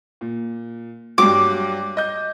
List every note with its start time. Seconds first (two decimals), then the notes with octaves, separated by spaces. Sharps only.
0.21 A#2
1.18 G2 F#3 D6
1.97 D#5 G6